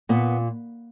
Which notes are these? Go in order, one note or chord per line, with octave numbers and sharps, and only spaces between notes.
A#2 B3